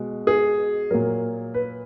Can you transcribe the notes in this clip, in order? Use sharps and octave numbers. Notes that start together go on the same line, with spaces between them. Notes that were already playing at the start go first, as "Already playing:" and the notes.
Already playing: B2 G#3
G#4
A#2 F#3 A#4
B4